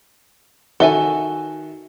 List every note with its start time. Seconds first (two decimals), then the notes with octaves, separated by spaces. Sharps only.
0.80 D#3 F#4 A4 E5 G#5 G7